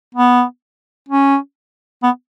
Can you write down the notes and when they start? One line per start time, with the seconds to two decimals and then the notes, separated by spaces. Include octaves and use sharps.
0.15 B3
1.08 C#4
2.03 B3